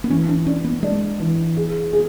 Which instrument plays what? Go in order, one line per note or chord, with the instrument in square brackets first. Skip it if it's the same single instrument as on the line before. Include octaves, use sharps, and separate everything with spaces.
[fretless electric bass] B3
[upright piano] E3 [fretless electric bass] C#4
[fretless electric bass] D4
[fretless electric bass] C#4 [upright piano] D4
[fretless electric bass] B3
[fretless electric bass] G#3 [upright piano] D4
[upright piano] E3
G#4
G#4